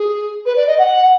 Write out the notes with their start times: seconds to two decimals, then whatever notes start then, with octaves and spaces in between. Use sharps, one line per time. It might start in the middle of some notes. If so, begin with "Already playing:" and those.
Already playing: G#4
0.46 B4
0.57 D5
0.67 D#5
0.79 F#5